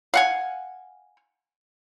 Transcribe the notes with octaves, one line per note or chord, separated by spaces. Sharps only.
F5 F#5 G#5